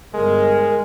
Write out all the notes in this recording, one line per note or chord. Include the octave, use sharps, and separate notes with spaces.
G1 G#3 A#4